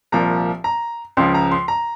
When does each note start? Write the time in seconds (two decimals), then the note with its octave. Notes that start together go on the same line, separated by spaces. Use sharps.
0.12 C2 A#2 F3 A#5
0.64 A#5
1.17 C#2 C#3 F3 C6
1.35 A#5
1.52 C6
1.68 A#5